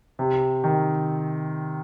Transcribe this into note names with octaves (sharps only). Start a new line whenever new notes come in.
C3
D#3